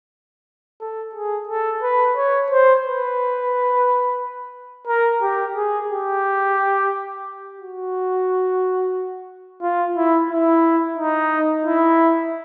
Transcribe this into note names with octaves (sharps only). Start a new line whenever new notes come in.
A4
G#4
A4
B4
C#5
C5
B4
A#4
G4
G#4
G4
F#4
F4
E4
E4
D#4
E4